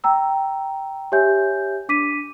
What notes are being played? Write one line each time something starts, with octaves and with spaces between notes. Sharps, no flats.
G5 A#5 E6
G4 C#5 E5 G#5 G6
D4 D6 B6 D#7